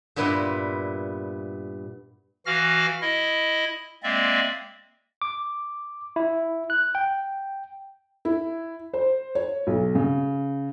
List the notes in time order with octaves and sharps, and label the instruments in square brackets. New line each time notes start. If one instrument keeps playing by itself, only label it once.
[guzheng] G2 A#2 B3 E4 D#5 C6
[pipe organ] E3 F#4 F5 F6 A#6
E4 D#5
G#3 A#3 C4 D5 E5
[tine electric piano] D6
E4
F#6
G5
[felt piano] E4
C5
C#5
B1
C#3